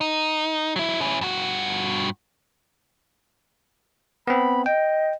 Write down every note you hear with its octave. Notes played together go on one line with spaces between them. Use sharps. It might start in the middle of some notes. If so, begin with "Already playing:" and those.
D#4
F#3 E4
C#4 E4
G2 F#4
B3 C4 B5
D#5 G5